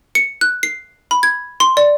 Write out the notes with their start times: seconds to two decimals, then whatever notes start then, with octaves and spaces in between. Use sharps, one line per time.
0.15 C#7
0.41 F#6
0.63 C7
1.11 B5
1.23 G#6
1.60 C6
1.77 D5